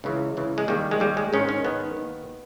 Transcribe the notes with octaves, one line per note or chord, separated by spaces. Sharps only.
C#2 C#3 E3
C#2 C#3 E3
G#3
D#2 D#3 G3
G#3
D#2 D#3 G3
G#3
G#2 D#3 C#4
C#4
G#2 D#3 B3
D#2 D#3